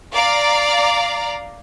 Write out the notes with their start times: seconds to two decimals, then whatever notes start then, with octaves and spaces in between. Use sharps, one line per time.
0.14 D5 F5 A#5